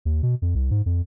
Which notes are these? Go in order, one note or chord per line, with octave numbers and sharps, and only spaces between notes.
D#2
B2
F2
C2
G#2
F2